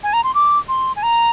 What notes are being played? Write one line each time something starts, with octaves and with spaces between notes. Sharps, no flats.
G#5
A#5
C6
D6
C6
G#5
A#5